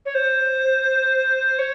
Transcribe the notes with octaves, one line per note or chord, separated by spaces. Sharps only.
C#5
C5
C#5